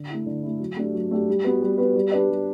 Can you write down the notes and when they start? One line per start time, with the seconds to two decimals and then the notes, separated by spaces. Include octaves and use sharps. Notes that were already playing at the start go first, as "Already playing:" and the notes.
Already playing: D3
0.09 A3 E4
0.26 D3
0.43 A3 E4
0.60 F#3
0.76 A3 D4 G4
0.94 F#3
1.11 A3 D4 G4
1.28 G3
1.44 B3 F#4 B4
1.62 G3
1.78 B3 F#4 B4
1.96 G3
2.11 D4 G4 B4 D5
2.30 G3